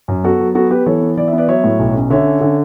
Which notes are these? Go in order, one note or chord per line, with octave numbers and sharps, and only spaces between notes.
F#2
B3 F#4 A4
F#3
B3 F#4 A4
B3 G4 B4
E3 A4 C#5
B3
E3 D5
E5
B3
B4 D5
F#3 C#5 E5
A2
B1
C#4
D3 C#5 E5
C#4
D3